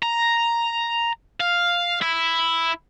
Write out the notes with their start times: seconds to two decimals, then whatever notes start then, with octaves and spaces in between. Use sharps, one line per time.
0.03 A#5
1.40 F5
2.02 E4